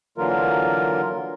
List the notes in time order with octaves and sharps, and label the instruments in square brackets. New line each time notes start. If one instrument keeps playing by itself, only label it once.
[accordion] D3 E3 F#3 A#3 F4 A#4